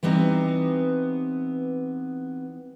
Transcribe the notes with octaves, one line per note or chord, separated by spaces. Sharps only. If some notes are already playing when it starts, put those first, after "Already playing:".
E3 G3 B3 C4 D#4